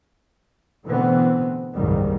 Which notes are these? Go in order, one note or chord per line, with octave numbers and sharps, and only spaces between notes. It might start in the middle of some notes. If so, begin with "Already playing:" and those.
B2 D3 E3 A3 B3 C4
F#1 C2 G#2 D#3 G3